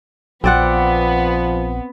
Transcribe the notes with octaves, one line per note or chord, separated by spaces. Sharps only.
A#1 F3 B3 C4 D5 F#5